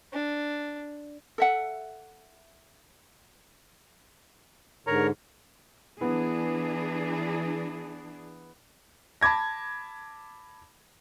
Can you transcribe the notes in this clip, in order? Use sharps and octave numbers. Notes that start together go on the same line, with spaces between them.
D4
A4 E5 F#5
G#2 D3 A#4 C#5 A#5
E3 B3 D4 E4 G#4
A5 B5 D6 G#6 A#6